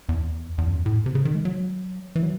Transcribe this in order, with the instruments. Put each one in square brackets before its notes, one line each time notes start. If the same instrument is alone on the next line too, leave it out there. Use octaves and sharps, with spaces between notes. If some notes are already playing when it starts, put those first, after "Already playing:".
[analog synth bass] E2
E2
F#2
A2
C3
C#3
D#3
G#3
F#3
E3
F#3